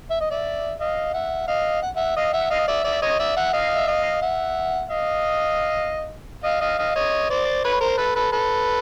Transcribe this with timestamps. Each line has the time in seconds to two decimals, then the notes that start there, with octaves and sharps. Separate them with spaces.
0.10 E5
0.21 D#5
0.31 D5 E5
0.79 D#5 F5
1.14 E5 F#5
1.47 D#5 F5
1.82 F#5
1.96 E5 F#5
2.16 D#5 F5
2.33 E5 F#5
2.50 D#5 F5
2.68 D5 E5
2.84 D5 E5
3.02 C#5 D#5
3.19 D5 E5
3.36 E5 F#5
3.53 D#5 F5
3.75 E5
3.88 D#5 F5
4.22 E5 F#5
4.89 D#5 F5
6.44 D#5 F5
6.61 D#5 F5
6.79 D#5 F5
6.95 C#5 D#5
7.30 C5 D5
7.64 B4 C#5
7.80 A#4 C5
7.97 A4 B4
8.15 A4 B4
8.32 A4 B4